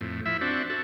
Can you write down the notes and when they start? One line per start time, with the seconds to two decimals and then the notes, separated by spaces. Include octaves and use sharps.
0.01 F2 A2
0.26 F3 E4 E5
0.41 C4 D4 F#4
0.70 F#4 A4